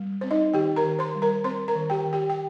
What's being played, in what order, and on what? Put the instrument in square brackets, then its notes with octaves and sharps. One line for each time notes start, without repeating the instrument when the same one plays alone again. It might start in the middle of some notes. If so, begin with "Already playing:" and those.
Already playing: [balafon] G3
C4 C5
D#4 D#5
D#3 G4 G5
A#4 A#5
D#3
C5 C6
G3
A#4 A#5
C4 C5 C6
A#4 A#5
D#3
G4 G5
D#3
G4 G5
G5